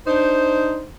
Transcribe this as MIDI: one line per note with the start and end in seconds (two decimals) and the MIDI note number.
0.07 0.86 62
0.07 0.86 63
0.07 0.86 72